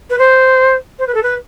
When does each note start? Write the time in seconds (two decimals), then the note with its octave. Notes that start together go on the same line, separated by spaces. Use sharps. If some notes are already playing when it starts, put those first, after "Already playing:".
0.10 B4
0.19 C5
0.99 C5
1.07 B4
1.15 A4
1.23 B4